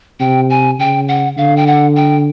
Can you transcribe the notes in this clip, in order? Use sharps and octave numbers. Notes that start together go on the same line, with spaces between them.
C3 G5
G#5
C#3 G5
F#5
D3 F5
G5
F#5
G5